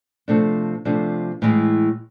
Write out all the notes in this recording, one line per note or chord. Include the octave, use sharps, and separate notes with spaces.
C3 F3 A3 D4
C3 F3 A3 D4
A2 E3 G#3